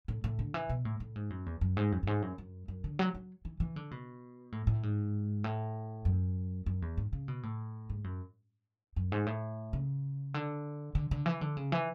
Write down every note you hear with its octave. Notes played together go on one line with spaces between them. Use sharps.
A2
A2
D3
E3
B2
A2
A2
G#2
F#2
E2
F#2
G#2
F#2
F#2
G#2
F#2
F#2
F#2
D3
F#3
F#3
E3
E3
D3
B2
A2
A2
G#2
A2
F#2
F#2
E2
G#2
C#3
B2
A2
G#2
F#2
F#2
G#2
A2
C#3
D3
D3
D3
E3
D3
C#3
E3